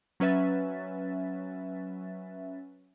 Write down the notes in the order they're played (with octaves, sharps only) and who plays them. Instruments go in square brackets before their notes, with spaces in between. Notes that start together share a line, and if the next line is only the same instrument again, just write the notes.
[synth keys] F#3 C#4 B4 E5 A6